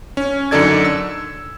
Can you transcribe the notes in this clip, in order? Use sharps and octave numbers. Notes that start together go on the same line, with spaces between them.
C#4
F#2 D3 D#4 A4 D5 G#6
E6